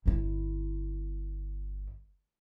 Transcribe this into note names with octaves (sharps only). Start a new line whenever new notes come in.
G1 E4